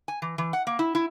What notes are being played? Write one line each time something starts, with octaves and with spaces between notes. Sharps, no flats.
G#5
E3
E3
F#5
A#3
E4
E4